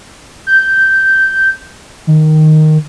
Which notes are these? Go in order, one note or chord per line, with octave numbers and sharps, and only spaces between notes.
G6
D#3